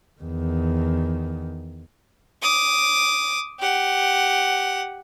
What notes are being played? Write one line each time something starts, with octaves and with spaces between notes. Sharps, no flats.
E2 D#3
D6 D#6
G4 F#5